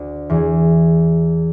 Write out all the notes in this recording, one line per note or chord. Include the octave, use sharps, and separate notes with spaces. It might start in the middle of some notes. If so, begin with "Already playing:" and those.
Already playing: D2 D3
E2 E3